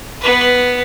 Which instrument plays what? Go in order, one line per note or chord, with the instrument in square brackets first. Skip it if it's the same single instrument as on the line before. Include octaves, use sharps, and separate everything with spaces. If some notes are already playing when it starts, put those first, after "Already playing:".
[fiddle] B3 B4